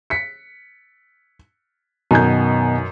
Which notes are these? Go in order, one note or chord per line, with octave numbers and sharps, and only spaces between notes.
B6 C#7
F#2 B2 D#3 G#5 G6